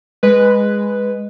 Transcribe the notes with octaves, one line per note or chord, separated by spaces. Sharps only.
G#3 B4